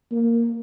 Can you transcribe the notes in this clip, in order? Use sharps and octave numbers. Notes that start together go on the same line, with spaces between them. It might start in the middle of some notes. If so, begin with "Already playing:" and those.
A#3